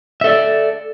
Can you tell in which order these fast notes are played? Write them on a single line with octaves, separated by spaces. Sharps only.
E5 A4 D5